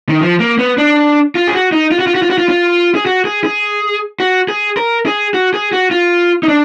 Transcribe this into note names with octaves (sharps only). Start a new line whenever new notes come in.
D#3
F3
A#3
B3
D4
F4
G#4
F#4
D#4
F4
F#4
F4
F#4
F4
F#4
F4
F4
G#4
F#4
G#4
G#4
F#4
G#4
A#4
G#4
F#4
G#4
F#4
F4
D#4
D4